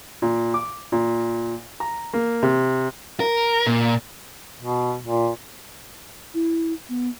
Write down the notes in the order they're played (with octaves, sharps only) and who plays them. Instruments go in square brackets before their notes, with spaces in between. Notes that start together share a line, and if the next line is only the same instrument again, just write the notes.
[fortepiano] A#2
D6
A#2
A#5
A#3
C3
[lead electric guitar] A#4
A#2
[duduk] B2
A#2
[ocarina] E4
B3